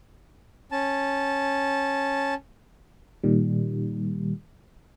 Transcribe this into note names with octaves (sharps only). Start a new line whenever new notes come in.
C#4 A5
A#2 D#3 G3